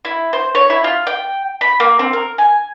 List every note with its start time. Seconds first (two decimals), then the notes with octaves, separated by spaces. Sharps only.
0.05 E4
0.33 C5
0.55 C#5
0.70 E4
0.84 F4
1.07 G5
1.61 B5
1.80 A#3
1.99 C4
2.13 A#4
2.38 G#5